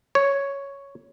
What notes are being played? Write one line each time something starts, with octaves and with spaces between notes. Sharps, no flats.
C#5